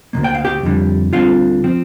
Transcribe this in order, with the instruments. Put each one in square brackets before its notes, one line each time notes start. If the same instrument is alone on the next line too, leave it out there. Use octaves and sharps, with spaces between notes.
[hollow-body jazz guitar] D2 C3 A#3
G5
F5
G4 G5
F2 D3 G3
D2 D3 G3 C4 F4 F5
F3 C4